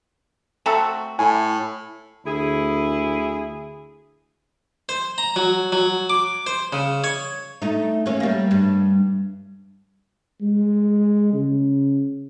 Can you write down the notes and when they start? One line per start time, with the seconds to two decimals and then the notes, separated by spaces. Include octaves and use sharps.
0.66 A3 C4 F#4 A5 A#5 E6
1.19 A2 G#5
2.25 D2 E4 G#4
4.89 C5
5.18 A#5
5.36 F#3
5.72 F#3
6.10 D6
6.47 C5
6.73 C#3
7.04 C#5
7.62 A3 D#4
8.06 E3 A#3 C#4
8.20 G3 A#3
8.51 G2
10.41 G#3
11.33 C#3